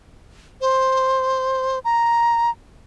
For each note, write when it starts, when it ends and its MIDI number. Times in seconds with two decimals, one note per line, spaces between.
0.61 1.79 72
1.85 2.50 82